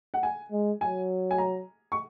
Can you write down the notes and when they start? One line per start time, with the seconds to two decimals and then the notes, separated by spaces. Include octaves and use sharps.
0.14 F#5
0.23 G#5
0.52 G#3
0.81 F#3 G#5
1.31 G#5
1.38 A#5
1.92 C#6